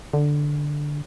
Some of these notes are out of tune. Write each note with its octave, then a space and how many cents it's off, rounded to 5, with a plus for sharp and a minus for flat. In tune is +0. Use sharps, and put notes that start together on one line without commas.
D3 +0